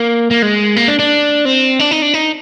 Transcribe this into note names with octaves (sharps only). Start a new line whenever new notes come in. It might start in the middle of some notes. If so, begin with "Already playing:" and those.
Already playing: A#3
A#3
G#3
A#3
D4
D4
C4
D4
D#4
D4
D#4